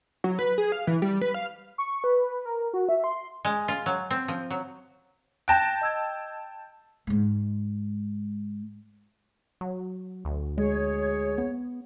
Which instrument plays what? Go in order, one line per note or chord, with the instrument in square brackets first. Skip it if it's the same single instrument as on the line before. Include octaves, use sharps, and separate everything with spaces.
[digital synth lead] F#3
B4
G#4
F5
E3
G3
B4
F5
[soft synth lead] C#6
B4
A#4
F#4
E5
C6
[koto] G#3
F4
F#3
C4
F3
F#3
[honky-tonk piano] G5 A5 [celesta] F#6 A#6 E7
[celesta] D#5 E6 G#6
[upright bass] G#2 G#3
[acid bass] F#3
D2
[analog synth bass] G#3 [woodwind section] G#4 C#5
[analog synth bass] B3